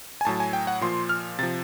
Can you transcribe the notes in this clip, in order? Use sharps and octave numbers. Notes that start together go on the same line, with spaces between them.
G#5
A2 F#3 A5
G#5
G5
F#5
A#2 F3 C6
F6
C3 F3 A6